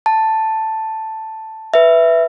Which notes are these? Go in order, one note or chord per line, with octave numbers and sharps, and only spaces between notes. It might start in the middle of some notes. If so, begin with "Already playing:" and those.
A5
B4 E5